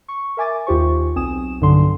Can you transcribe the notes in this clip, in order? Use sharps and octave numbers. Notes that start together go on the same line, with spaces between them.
C#6
A#4 E5 G#5 D6 A6
D#2 F4 G4 C5 C#6
B1 C4 G#5 D#6 E7
B1 G2 D3 C6